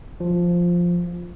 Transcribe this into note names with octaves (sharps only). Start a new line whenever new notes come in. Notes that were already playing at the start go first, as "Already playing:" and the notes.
F3